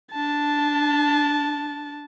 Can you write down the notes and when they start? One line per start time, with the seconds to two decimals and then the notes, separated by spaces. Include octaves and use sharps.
0.12 D4 A5